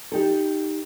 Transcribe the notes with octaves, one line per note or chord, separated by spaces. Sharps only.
D#4 G4 A4